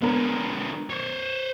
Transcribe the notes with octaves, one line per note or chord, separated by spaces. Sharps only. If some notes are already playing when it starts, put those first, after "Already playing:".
D3 G#3 B3 A#4 B4
C5 C#5